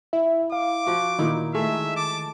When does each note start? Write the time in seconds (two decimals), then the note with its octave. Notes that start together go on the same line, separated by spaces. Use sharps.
0.13 E4 E5
0.52 F5 D6
0.86 F3 F#4
1.19 A#2 D#3 D#4 E4
1.54 G#3 A3 E5
1.96 A5 D6